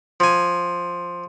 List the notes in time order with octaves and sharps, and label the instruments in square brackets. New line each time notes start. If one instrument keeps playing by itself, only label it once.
[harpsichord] F3 G#5